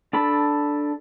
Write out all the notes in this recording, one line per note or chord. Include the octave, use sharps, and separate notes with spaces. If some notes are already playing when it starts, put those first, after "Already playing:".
D4 A4 B5